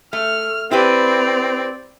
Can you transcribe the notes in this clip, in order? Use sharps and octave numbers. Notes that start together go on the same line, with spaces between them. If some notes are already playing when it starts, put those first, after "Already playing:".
A3 F6
C4 E4 G4 B4 D5